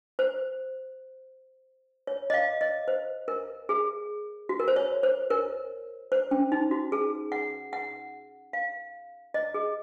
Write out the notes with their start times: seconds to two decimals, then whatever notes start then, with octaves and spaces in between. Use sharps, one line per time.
0.19 C5
2.07 C#5
2.30 D#5
2.34 F5
2.61 D#5
2.88 C5
3.28 A#4
3.69 G#4
4.49 F#4
4.60 A#4
4.68 C5
4.76 C#5
5.03 C5
5.30 A#4
6.12 C5
6.31 C#4
6.52 D#4
6.71 F#4
6.92 G#4
7.32 F#5
7.73 F#5
8.53 F5
9.34 D#5
9.54 G#4